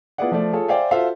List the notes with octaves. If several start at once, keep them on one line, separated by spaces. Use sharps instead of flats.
B3 E4 F4 G#4 D5 F#5
F3 A3 D5
F4 G#4 A4 C#5
C5 D5 E5 F5 G5 G#5
F4 F#4 A4 C5 E5 F5